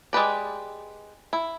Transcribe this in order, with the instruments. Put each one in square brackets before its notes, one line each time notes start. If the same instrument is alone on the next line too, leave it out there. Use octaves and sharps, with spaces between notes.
[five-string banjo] G#3 G4 B4 D5
E4